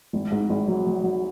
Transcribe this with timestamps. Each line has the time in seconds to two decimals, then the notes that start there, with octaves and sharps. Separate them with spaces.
0.13 G#1
0.32 G#2
0.50 G#1
0.68 F#3
0.87 F#3
1.04 F#3